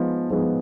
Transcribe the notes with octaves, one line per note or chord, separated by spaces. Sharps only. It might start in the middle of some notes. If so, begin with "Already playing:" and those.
Already playing: F3 G#3 B3 D#4
F3 G#3 B3 D#4